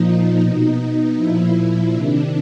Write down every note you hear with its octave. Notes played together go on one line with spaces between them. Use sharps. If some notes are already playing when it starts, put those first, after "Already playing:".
Already playing: A#2 F3 D#4
B2
A#2 F3 E4
C3 D#3 D4